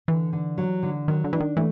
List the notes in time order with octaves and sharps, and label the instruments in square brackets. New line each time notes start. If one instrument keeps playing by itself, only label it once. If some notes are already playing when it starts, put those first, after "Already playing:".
[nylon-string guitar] D3 [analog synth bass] E3
[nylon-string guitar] D3
F#3
D3
[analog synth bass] D#3 [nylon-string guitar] F#3
[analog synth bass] D3
[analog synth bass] E3 [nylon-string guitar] D4
[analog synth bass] D#3
[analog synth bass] E3 [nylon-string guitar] A3